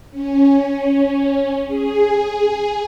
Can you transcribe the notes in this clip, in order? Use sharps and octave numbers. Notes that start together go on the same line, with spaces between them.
C#4
G#4